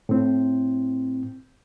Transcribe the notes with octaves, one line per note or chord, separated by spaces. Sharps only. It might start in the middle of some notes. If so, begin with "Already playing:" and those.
A2 C4